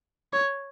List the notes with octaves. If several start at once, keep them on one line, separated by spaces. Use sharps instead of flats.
C#5